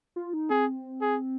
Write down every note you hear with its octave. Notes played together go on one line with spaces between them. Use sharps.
F4
D#4
C4 G#4
G#4